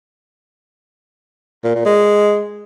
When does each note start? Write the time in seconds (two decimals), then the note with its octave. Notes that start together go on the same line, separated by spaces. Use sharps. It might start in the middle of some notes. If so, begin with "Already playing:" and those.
1.64 A#2
1.75 A#2
1.86 G#3